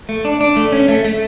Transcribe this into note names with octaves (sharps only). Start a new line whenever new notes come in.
A3
D4
D4
A3
C#4
A3
A3